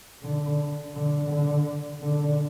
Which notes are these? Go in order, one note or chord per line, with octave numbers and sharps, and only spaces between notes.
D3
D3
D3
D3